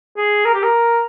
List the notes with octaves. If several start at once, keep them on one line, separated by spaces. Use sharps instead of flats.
G#4
A#4
G4
A#4